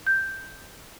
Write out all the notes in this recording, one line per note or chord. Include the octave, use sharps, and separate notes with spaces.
G6